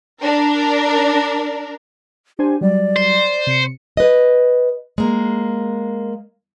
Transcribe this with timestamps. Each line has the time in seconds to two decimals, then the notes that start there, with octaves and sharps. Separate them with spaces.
0.20 D4 A#4
2.39 D4 G4 C5 G#5
2.61 F#3 G3 D5
2.96 C5
3.47 C3 C#7
3.97 B4 D#5
4.98 G#3 A#3